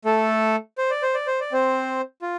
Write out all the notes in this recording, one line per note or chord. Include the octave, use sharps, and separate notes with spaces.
A3 A4
C5
D5
C5
D5
C5
D5
C4 C5
F4